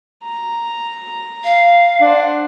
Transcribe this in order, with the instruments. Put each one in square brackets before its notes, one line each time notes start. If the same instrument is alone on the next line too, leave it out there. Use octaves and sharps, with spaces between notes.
[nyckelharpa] A#5
[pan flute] F5
[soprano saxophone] D4 [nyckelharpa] C5 F#5